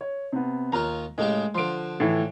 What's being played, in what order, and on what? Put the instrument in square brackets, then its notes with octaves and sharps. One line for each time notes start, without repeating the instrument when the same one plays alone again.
[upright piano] C#5
C3 B3
[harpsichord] D#2 F4 C#5 [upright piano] A#5
[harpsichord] A2 C#3 G4 [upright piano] G#3
[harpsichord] D3 F3 [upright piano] C6 D7
[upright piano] A2 E3